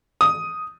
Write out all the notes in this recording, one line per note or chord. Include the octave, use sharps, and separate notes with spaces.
D#6